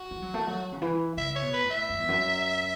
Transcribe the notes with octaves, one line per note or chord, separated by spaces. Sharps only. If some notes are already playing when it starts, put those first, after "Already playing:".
Already playing: F#4
A3
F#3
A3
F#3
C#3
E3
C#3 E5
C#5
B2
B4
A2
E5
F#2
E2
F#2